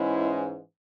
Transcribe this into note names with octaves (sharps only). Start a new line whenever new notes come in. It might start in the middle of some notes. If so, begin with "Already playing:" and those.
Already playing: G#2 E3 G#3 C#4 E4